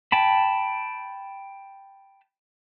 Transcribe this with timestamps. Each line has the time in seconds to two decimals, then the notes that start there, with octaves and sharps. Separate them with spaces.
0.12 G5 A5 B5